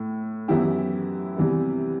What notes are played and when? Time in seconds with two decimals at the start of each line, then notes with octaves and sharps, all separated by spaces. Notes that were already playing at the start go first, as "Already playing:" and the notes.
Already playing: A2
0.48 F#2 E3 B3 E4 G4
1.37 C3 E3 G3 B3